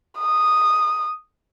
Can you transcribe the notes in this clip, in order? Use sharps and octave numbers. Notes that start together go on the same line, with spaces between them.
D#6